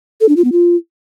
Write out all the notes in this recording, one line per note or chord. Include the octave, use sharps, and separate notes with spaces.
A4
D4
F4
B3
F4